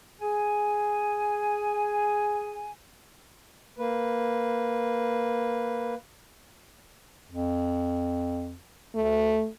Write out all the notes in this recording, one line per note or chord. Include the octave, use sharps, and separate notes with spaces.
G#4 G#5
A#3 B4
F2
D2 A3